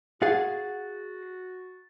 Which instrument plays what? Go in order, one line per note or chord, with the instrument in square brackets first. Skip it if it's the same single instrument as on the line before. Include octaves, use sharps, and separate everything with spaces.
[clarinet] F#4 [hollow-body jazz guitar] G#4 F5 F#5 [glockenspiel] A6